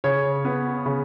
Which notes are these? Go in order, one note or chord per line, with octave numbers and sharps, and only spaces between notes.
C#3 C#5
B3
C#3